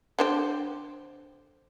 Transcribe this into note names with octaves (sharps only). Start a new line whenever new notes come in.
D3 C4 G4